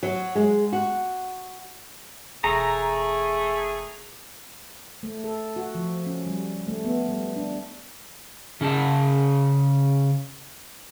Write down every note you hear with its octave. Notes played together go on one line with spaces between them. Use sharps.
F#3
G#3
F#4
E1 A3 G#4 A#5
A3
A4
F#4
F3
C#4
G3
A3
B3
G3
D4
C#3 C#4 G#4 A5